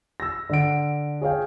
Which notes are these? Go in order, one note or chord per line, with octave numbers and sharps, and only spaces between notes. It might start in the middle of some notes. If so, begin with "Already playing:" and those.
E6 A#6
D3 F#5 D7
G#4 C#5 F5 G5